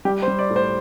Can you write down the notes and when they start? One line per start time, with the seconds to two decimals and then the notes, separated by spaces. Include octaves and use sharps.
0.05 G3 G4
0.22 C5
0.28 G3
0.39 D5
0.50 A2
0.56 C5